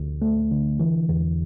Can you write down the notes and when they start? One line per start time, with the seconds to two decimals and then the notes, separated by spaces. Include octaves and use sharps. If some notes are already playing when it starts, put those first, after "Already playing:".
Already playing: D2
0.22 A3
0.51 D3
0.80 E3
1.09 E2